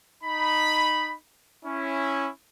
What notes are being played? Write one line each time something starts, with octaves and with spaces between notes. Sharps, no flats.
D#4 B5
C#4 E4